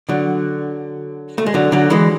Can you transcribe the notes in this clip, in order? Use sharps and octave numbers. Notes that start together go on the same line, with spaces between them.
D3 F#3
A3
G#3
D3 F#3
D3 F#3
E3 G#3